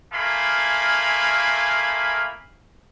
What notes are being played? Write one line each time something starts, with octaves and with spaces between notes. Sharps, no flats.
A3 A#3 F4 F5 G#5 B5